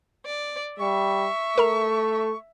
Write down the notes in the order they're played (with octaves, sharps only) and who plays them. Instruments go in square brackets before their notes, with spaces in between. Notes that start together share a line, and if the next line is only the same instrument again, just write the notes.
[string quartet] D5
[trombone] G3 [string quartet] E5 [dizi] C#6
[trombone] A3 [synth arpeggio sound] A#4 A#5